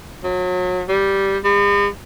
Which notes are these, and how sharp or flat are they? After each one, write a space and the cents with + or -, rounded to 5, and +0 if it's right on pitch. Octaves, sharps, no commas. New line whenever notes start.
F#3 -30
G3 -5
G#3 -45